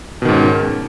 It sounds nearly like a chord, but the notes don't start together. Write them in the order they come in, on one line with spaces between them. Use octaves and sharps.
B2 D#3 G#2 C#4